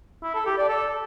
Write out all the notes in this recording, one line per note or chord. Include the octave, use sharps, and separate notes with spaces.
E4
A4
G4
D5
A4